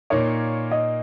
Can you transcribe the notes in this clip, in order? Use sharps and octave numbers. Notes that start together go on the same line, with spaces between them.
A#2 A#3 D#4 A#4 C#5
D#5